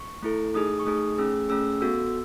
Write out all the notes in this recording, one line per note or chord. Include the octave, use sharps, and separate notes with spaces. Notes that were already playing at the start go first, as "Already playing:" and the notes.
Already playing: C#6
A3 E4 A4
A3 D#4 G#4 D#6
C#6
A3 D#4 G#4 D#6
A3 C#4 G#4 E6
A3 C#4 G#4 E6
B3 F#4 A4 E6